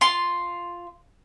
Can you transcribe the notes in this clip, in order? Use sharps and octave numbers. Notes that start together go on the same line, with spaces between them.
F4 C6